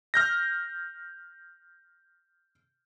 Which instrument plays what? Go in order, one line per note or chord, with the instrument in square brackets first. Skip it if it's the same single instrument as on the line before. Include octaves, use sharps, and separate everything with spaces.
[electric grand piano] F6 G6 A#6